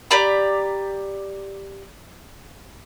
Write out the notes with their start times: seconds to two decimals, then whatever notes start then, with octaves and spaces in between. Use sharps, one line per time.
0.11 G4 D5 A#5 B5